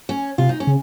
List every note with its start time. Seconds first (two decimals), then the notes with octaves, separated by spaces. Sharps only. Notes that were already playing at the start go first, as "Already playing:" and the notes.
0.09 C#4
0.38 C3 F4
0.49 D#4
0.60 C#4
0.67 C#3